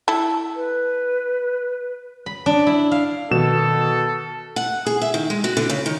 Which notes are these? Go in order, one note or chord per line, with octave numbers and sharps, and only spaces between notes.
E4 A4
B4
B5
D4
E4
F5
B2 D#3 A4 E7
F#5
G#4
E5
D#3
G#3
F#4
D3
C#3
D#3